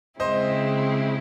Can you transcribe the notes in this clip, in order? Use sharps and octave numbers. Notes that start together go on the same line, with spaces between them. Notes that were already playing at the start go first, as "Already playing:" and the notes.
C#3 G#3 C4 E4 C5 D#5